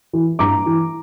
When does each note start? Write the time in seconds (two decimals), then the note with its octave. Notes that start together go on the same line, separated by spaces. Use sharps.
0.13 E3
0.39 G2 A#5 D6
0.66 E3